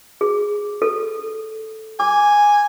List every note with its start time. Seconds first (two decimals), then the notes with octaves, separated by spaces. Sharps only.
0.21 G#4
0.82 A4
2.00 G#5 D6